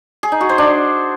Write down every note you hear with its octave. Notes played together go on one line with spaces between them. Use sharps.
G#4
D#4
F#4
C5
D4